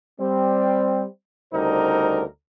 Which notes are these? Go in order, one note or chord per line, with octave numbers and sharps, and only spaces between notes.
G3 C4
D2 C#3 G3 D#4 A#4 C5